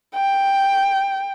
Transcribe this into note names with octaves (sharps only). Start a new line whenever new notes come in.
G5